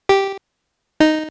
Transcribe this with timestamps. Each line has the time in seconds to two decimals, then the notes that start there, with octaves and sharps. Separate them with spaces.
0.09 G4
1.00 D#4